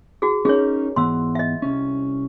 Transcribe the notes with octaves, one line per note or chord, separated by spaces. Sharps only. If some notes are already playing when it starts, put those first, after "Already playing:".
F#4 G#4
C#4 D#4 G#4 A#4 C#5
G#2 E3 B3 C6 E6
D#5 E5
C2 C#4